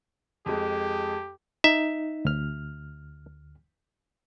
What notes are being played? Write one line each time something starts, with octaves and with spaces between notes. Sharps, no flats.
F2 G#3 G4
D#4 E5
D2 F6